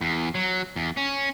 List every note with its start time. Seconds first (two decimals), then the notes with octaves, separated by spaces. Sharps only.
0.01 E2
0.35 F#3
0.76 E2
0.97 C#4